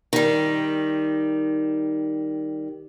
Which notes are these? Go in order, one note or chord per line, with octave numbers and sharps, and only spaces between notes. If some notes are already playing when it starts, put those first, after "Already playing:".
D#3 G3